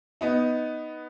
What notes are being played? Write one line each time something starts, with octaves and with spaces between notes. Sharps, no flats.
B3 D#4